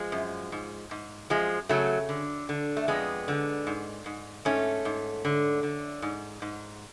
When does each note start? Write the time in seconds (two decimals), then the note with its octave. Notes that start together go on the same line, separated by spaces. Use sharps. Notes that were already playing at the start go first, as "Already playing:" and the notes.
Already playing: F3 G#3
0.12 F#2
0.52 G#2
0.91 G#2
1.30 F#2 F3 G#3
1.69 C#3 F#3 A3
2.09 D3
2.49 D3
2.77 A3
2.88 F2 G#3 B3
3.28 D3
3.67 G#2
4.06 G#2
4.45 G#2 A3 C#4
4.85 G#2
5.25 D3
5.63 D3
6.02 G#2
6.42 G#2